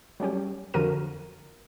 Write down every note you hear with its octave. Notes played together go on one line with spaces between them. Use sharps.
F#3 G3 C#4 G4
F2 D3 F3 F#4 A#4 D#7